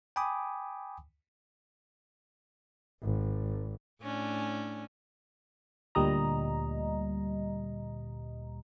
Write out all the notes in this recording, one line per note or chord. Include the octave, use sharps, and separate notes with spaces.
G5 G#5 B5 D6 D#6
G#1
A2 C#4 D4
D2 A#2 G3 D#5 A#5